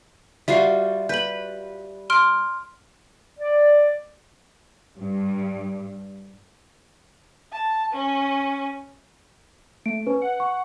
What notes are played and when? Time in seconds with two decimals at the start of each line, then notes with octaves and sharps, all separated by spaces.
0.48 G3 F4 F#4 E5 C7
1.09 B4 G6 F#7
2.10 C6 F6 D7
3.39 D5
4.98 G2
7.52 A5
7.93 C#4
9.86 A3 D7
10.06 C#4 B4
10.22 F#5
10.40 C#6